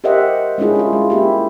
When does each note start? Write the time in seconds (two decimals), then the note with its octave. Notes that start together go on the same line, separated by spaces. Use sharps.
0.04 G4 A#4 C5 D#5 E5 F#5
0.58 G#3 C#4 D4 E4 F4 G#4
0.75 E4 F4
0.93 G#3
1.10 A#3 E4 G4